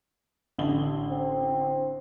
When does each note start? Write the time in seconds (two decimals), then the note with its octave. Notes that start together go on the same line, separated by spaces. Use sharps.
0.58 A1 D3 G7
1.10 C4